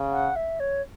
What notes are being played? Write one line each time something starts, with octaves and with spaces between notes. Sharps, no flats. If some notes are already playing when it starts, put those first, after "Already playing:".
Already playing: C#3
F#5
E5
C#5